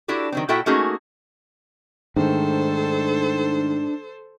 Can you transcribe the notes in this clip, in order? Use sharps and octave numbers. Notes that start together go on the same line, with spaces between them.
D4 E4 F#4 G4 A4
D#3 F#3 C4
A#2 E4 F#4 A4 E5 G5
A3 A#3 C#4 D#4 F#4 G#4
G#2 D#3 A3 D4 A4 C5